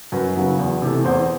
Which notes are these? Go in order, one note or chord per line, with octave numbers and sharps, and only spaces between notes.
F#2 B4
C#3 F#3 B3
E2
C3 E3 A3
E2 C5